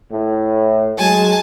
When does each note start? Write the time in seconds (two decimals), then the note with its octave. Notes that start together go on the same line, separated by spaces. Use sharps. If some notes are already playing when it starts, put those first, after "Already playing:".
0.10 A2
0.99 F#3 G#3 G#5 A5